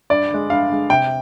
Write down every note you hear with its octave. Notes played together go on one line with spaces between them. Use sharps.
G2 D5
D3 G#3
G2 F5
D3 G#3
C3 G5